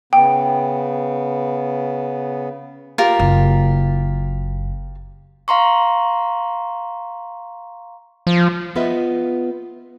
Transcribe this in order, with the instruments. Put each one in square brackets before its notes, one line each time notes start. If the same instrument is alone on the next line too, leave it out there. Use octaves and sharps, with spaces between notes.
[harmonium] C#3 B3 [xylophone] G5
[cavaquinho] F4 G4 A#4
[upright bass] F#1
[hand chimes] F5 A#5 C6 C#6
[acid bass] F3
[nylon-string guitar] B3 F4 G#4 B4 D#5 E5